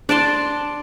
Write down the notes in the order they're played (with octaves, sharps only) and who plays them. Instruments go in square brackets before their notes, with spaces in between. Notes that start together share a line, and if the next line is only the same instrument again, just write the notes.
[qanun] D4 D5 A5 C6